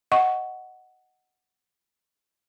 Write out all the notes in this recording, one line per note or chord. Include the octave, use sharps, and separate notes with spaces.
D#5 F#5 C#6